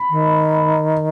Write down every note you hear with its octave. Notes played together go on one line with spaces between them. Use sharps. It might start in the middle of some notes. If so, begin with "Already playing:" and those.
Already playing: B5
D#3